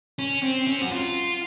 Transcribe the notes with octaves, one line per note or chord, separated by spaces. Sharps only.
C#4
C4
C#4
F#4
F4